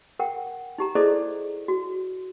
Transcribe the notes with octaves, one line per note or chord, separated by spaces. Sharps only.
A#4 F#5 G5
D#4 G4 A#5
E4 G#4 A4 C5 D5 D#5
F#4